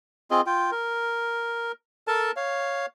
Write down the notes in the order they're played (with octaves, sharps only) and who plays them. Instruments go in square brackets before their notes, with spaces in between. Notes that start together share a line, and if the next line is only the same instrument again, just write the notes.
[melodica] C4 F4 G#4 D#5
F4 G5
A#4
A4 A#4 A5
C#5 F5